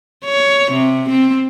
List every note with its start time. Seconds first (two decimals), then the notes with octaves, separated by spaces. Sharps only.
0.25 C#5
0.72 C3
1.10 C4